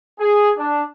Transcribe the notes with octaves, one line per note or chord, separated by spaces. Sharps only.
G#4
D4